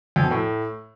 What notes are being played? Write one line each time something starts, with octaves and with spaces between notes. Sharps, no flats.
F2
B2
A2